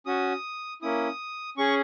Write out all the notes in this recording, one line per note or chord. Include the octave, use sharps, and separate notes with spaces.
C#4 F#4 D#6
A#3 C#4 E4 D#6
C#4 G#4 C#6